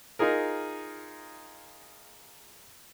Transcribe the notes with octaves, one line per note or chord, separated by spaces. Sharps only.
D#4 F4 G#4 A#4